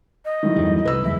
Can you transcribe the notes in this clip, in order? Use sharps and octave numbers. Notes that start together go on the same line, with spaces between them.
D#5
F#2 A2 D#3
E2 G2 G3
C2 B4 E6
F#1 E2 G#3 E5